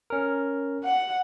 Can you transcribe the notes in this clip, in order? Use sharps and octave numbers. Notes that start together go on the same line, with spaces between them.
C#4 A#4
F#5